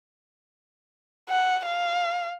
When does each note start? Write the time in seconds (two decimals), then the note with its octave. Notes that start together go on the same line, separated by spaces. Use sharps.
1.29 F#5
1.66 F5